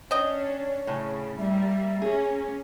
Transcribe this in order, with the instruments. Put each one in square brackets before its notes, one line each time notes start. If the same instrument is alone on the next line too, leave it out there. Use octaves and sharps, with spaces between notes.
[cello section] C#4 D4 [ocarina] C#5 [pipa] D#5 G5
[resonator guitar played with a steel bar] A2 C#4 [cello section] C#3
[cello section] G3 A#3 [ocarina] E5
[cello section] A#3 C#4 [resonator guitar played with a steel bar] G#4